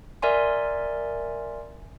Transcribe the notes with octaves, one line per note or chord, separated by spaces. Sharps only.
A#4 D5 E5 G#5 C6